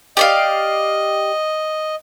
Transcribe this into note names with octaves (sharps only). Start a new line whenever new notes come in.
G4 D5 D#5 F5